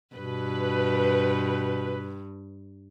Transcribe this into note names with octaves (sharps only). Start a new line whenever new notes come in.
G2 B2 B4